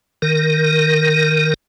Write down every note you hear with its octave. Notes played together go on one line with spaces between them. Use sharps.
D#3 A#4